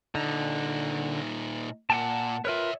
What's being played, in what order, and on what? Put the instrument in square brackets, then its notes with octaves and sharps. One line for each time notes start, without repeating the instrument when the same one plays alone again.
[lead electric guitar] A#2 D#4 [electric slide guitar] D3
[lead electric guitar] A#2 [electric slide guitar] F#5 G5 A5
[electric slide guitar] F4 A#4 B4 [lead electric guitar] C#5 E5